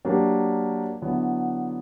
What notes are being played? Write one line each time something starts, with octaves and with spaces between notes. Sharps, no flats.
F#3 A#3 D4 G4 A#4
D3 F#3 B3 E4